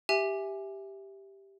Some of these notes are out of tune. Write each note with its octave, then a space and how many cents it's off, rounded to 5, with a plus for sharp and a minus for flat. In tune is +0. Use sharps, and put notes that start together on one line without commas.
G4 +0 E5 +0 G#5 +0